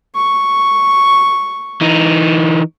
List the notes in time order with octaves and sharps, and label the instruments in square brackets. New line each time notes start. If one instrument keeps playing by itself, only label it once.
[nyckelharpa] C#6
[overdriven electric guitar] E3 D#4